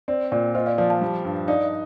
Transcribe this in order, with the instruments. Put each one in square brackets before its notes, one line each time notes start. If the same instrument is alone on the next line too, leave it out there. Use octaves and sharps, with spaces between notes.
[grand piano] C4 [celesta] D5
[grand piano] A#2 [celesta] D5
[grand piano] F4 [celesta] C5 D#5
[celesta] D5 F5
[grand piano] F3 [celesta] D5 F5
[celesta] F5 A5
[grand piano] G3
G2
[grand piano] D#4 [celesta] D5 F5